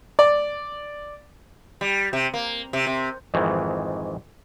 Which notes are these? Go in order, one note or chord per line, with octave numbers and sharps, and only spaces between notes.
D5
G3
C3
A#3
C3
C3
F2 G#2 D#3 E3